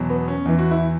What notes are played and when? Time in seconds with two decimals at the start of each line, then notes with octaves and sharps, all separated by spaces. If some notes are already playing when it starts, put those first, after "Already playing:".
Already playing: E2 B2 F#3
0.10 B3
0.28 C#4
0.45 E2 E3
0.59 F#4
0.71 E4